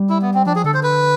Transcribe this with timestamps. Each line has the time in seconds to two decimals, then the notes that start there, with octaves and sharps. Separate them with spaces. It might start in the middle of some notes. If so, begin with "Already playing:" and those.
Already playing: G3
0.10 E4
0.22 B3
0.34 C4
0.46 F3 D4
0.56 G#4
0.64 D3 A4
0.74 C5
0.83 B4